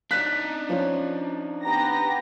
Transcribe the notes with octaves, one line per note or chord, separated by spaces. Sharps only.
D4 D#4 F#6 B6
F3 C#4
B3 G4 A#5 A#6